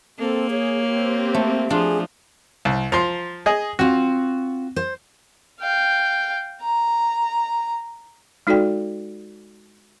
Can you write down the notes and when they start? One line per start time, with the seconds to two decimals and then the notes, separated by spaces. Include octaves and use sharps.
0.19 A#3 C4 A4
0.51 G#4 C#5
0.87 C4 G4
1.34 A3
1.70 F3 D4 F4 G#4
2.65 C2
2.92 F3 A#5 C6
3.46 G#4 D#5
3.79 C4 F4 F#4
4.76 C5
5.60 F5 G5
6.61 A#5
8.47 G#3 D#4 F#4 A4 D5 G5